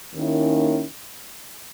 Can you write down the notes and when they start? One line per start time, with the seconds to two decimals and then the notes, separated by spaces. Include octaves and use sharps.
0.13 D#2 D#3 A#3 C#4 E4